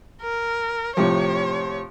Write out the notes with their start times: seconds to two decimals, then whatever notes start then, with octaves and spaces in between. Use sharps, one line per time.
0.22 A#4
0.97 A2 C3 F3 C#5